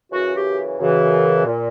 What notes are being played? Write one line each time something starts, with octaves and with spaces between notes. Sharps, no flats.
F#2 C#3 E3 F#4
G4
F#2 C#3 E3
A#2